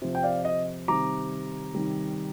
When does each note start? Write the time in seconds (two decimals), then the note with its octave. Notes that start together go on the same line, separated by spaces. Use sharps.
0.02 C3 F3
0.15 G5
0.23 D5 F5
0.45 D#5
0.88 C3 D#3 G3 A#5 D6
1.75 C3 D#3 G3